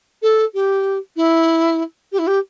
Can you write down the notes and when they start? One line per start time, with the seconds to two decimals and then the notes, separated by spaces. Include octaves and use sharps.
0.22 A4
0.54 G4
1.16 E4
2.12 G4
2.19 E4
2.27 G4